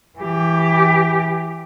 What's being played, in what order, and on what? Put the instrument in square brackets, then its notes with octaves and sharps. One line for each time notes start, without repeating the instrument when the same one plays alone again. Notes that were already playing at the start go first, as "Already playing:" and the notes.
[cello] E3 G4